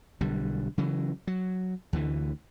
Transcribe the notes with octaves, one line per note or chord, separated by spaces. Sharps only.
B1 D3 G3
C#3 E3 F#3
F#3
D2 D3 E3